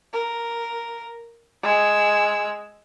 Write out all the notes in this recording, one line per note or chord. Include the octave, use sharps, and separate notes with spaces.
A#4
G#3 E6